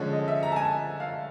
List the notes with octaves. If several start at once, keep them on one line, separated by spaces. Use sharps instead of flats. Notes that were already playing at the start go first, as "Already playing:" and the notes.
Already playing: D3 F3 G#3 C#4
D#5
E5
A#5
A5
G#5
F5